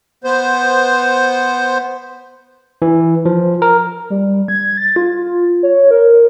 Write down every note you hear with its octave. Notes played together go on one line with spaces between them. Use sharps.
B3 C5
E3
F3
A#4
G3
G#6
A6
F4
C#5
A#4